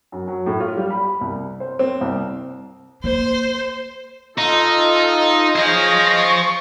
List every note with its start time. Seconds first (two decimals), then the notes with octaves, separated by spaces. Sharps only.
0.12 F#2
0.28 F#3
0.46 A2
0.60 F4
0.77 G3
0.90 B5
1.21 C2
1.60 C5
1.79 C4
2.01 C2
3.04 A#3 C5
4.38 D#4 F4 A4 D#5
5.56 G#4 C5 C#5 D#5 F5 A#6
6.18 C#6